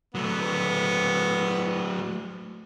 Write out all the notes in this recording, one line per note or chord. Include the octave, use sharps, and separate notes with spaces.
F#3 A3 B3